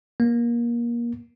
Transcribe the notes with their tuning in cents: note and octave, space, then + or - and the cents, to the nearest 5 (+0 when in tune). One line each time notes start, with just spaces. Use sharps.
A#3 +25